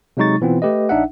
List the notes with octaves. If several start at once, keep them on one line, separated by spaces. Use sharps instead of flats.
C3 F#3 G#3 D#4 C#6 A6
B2 E3 B3 C4 F4
A3 G4 B4 D#5
A#1 D4 D#4 E5 F#5